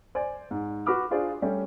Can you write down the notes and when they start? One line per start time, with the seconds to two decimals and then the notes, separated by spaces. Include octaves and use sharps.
0.15 C5 D5 G#5
0.51 G#2
0.86 F#4 B4 B5 D6 F6
1.11 D4 F4 G#4 C5 D5
1.42 G3 A3 C#4 G4